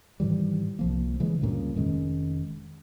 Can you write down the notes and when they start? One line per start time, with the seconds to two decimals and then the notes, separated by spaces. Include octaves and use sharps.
0.20 G#2 D#3 E3 G3
0.79 C2 F3 A#3
1.20 C#3 E3 G#3
1.41 D2 G2 A#2 C#3
1.75 F1 D#3 G#3 C#4